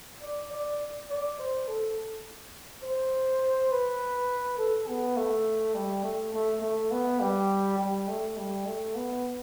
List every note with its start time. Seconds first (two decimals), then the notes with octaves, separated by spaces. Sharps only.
0.22 D5
0.51 D5
1.10 D5
1.39 C5
1.68 A4
2.83 C5
3.71 B4
4.58 A4
4.88 B3
5.16 A3
5.75 G3
6.03 A3
6.34 A3
6.62 A3
6.91 B3
7.20 G3
7.78 G3
8.08 A3
8.37 G3
8.66 A3
8.95 B3